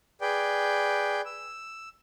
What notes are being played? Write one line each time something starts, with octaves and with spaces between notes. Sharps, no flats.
G#4 B4 D5 G5
E6